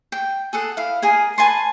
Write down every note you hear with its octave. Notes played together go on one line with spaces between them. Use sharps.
G5
G#4 A4 F#5
E4 F5
G#4 A#4 G#5
B4 G#5 A5 C6